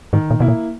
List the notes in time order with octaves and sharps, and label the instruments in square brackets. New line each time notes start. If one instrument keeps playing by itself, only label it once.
[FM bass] G#2 [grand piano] D#3
[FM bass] A#2
[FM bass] B2 [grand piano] A#3 E4
[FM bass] A#2